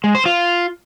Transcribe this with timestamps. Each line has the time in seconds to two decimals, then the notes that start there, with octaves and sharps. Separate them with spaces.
0.04 G#3
0.15 C5
0.26 F4